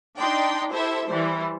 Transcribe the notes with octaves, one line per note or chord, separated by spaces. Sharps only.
D4 D#4 D5 G5 C6
E4 G4 A4 C5 E5
E3 G3 C5